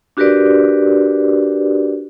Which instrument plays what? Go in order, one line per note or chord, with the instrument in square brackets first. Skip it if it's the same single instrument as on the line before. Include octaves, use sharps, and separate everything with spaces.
[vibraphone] D4 F#4 G4 A#4 B4 D5